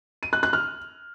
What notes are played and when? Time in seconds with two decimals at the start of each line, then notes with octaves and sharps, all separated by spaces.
0.23 D#7
0.33 F#6
0.43 F#6
0.53 F6